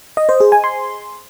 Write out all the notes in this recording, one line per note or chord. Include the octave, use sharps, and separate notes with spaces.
D#5
C5
G#4
G#5
C6